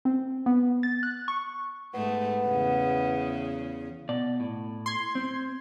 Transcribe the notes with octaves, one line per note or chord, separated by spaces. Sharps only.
C4
B3
A6
F#6
C#6
G#2 A3 B3
E2 C#3
B2 D5
A2
C6 G#6
C4